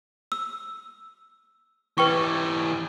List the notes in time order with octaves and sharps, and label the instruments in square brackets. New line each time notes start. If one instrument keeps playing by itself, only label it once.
[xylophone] E6
[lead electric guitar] E3 G4 [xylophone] B4 G5 C#6